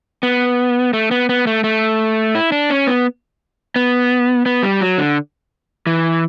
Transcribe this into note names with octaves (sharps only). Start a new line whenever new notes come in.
B3
A3
B3
B3
A3
A3
E4
D4
C#4
B3
B3
B3
G3
F#3
D3
E3